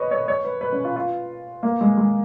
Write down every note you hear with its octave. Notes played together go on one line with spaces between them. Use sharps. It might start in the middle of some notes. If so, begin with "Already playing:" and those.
Already playing: B4 C#5 D#5
C#5
C#5
B4
B4
C#4
F4
F4
A#3
G#3
G#3